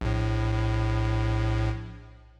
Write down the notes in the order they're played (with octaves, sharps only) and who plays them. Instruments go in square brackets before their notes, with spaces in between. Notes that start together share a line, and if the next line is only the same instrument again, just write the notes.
[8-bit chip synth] A#1 A2